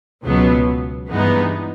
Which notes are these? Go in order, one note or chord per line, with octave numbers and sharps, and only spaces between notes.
C#2 B2 F#3 B3
G2 E3 G#3 B3 D#4